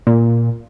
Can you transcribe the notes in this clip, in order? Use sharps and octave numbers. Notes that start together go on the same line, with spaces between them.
A#2